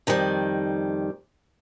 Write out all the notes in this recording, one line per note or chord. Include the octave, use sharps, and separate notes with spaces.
F2 D#3 G3